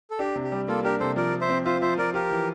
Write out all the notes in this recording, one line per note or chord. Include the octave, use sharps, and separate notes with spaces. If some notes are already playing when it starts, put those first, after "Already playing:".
A4
D4 G4
C3
G4
G3
A#3 F4 A4
D4 G4 A#4
C3 A4 C5
F3 A#4 D5
F3
C5 E5
C4
F4 C5 E5
F3 C5 E5
F3 A#4 D5
F4 G4 A#4
E3